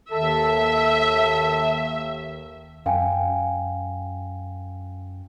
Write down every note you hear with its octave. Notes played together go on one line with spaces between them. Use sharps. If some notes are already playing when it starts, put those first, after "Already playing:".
D#2 D#3 A4 E5
F#2 F5 G5 G#5